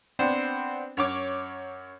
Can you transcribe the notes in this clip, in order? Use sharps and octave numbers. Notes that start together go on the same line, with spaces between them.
B3 C4 D4 C5
F#2 C#5 D6